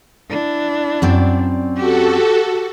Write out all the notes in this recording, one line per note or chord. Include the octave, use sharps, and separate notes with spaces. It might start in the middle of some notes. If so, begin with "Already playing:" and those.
D4 E4
F#2 C4 D5
F#4 G4 A4